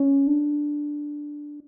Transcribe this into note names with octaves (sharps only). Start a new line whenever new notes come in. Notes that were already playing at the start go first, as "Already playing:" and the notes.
Already playing: C#4
D4